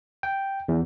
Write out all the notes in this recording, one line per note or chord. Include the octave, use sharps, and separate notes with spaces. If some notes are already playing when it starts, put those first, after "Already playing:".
G5
E2